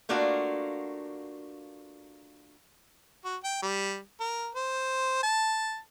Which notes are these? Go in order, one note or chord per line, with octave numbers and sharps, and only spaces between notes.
A3 A#3 D4 F4 F#4
F#4
G5
G3
A#4
C5
A5